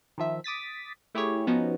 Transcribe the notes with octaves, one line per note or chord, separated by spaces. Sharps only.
D#3 F3 E5
D6 D#6 A6 B6
A3 E4 G4 G#4 C#5
F3 B3 C#4 D#4 F#4